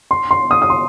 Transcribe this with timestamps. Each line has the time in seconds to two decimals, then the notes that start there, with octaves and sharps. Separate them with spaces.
0.11 C6
0.31 C6
0.51 D#6
0.62 D#6
0.70 C6